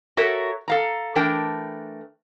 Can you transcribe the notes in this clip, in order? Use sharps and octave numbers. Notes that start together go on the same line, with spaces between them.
F#4 A4 A#4 C#5 E5
A4 F5 A#5
E3 A3 D4 A#4 G5